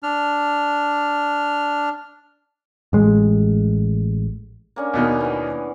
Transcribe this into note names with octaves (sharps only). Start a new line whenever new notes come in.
D4 F6
A1 G#3
A#3 C#4 D4
D#2 B2 D#3
E3 B3